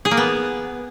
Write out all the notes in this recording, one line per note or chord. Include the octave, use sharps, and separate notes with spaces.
G#4
A#3
B3